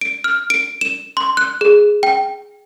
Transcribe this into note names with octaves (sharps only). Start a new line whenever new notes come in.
D7
F6
D7
E7
C6
F#6
G#4
G5